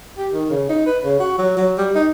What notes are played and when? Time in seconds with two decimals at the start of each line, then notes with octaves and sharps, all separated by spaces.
0.18 G4
0.33 D#3
0.50 C#3
0.69 D#4
0.86 B4
1.03 C#3
1.20 F#4
1.38 F#3
1.57 F#3
1.78 G3
1.95 D#4